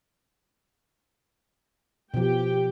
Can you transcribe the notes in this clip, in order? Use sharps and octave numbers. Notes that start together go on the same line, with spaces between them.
B2 F3 G4 G5